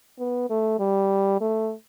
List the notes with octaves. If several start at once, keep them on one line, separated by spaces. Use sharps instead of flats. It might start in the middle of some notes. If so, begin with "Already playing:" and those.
B3
A3
G3
A3